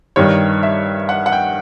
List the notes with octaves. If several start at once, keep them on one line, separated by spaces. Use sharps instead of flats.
G2 D#3 G3 C#5
E5
F#5
F#5
G5